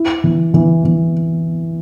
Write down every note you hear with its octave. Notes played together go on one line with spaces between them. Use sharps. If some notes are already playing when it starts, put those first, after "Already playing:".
Already playing: E4
E3
E3
E3